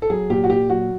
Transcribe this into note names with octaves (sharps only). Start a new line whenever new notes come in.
A4
F#3 G#4
A#2 G4
F#4
A#2 G4
F#3 F#4